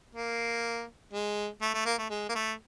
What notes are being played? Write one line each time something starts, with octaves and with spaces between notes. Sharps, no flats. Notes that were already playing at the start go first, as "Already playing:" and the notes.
A#3
G#3
A3
A3
A#3
A3
G#3
A#3
A3